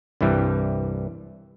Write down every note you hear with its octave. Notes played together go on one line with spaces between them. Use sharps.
C2 G2 E3 G3